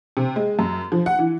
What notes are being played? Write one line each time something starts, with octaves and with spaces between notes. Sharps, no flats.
C3
G#3
F#2
F3
F#5
E3